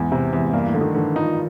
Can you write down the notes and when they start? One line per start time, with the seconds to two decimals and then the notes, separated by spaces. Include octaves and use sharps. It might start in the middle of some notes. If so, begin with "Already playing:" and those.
Already playing: E2 G#2
0.12 C3
0.33 E2
0.45 G#2
0.53 G2 A#3
0.67 A2
0.74 D3
0.81 D#3
0.94 D3 E3
1.16 F3 D#4